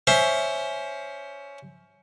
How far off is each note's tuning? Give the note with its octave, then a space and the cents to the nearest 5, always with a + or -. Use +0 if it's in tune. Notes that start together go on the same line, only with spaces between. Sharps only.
C#4 +15 C5 +10 E5 +0